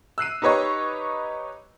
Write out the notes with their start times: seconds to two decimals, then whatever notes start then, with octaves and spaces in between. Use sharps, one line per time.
0.18 E6 F#6 C7 D#7
0.42 D#4 G4 B4 C#5 D#5 C#6